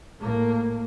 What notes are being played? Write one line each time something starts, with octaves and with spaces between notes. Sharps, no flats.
A2 A#3